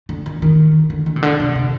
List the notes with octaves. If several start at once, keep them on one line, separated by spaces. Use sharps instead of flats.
D3
D#3
D#3
D3
D3
C3
D3
C3
C3